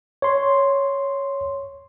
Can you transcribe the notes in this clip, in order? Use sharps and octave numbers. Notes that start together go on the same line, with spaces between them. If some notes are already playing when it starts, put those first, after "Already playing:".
C#5 C6